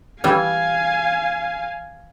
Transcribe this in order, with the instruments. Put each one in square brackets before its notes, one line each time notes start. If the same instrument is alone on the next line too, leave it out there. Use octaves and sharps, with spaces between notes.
[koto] E3 G3 [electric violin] F5 G#5